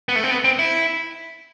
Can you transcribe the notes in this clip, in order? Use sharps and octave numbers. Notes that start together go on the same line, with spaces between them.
B3
A3
C4
B3
C4
E4